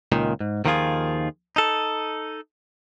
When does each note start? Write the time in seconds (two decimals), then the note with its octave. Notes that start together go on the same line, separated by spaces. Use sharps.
0.12 C#2 A#2 D#3
0.40 G#2
0.65 D#2 D#3 F3 D#4 F4 G#4
1.56 D#4 A4